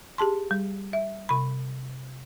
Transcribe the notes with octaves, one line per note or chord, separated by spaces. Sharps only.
G4 G#4 A5 C6
G3
E5
C3 B5